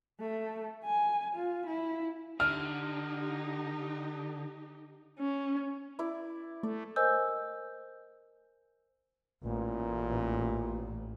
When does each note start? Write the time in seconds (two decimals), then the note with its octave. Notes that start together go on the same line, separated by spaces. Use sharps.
0.20 A3
0.85 G#5
1.35 F4
1.67 E4
2.40 D3 D#4 G4 F6
5.19 C#4
5.99 E4 D5
6.63 A3 D5
6.96 A#4 C5 D#5 G#5 E6 G6
9.44 A1 A#2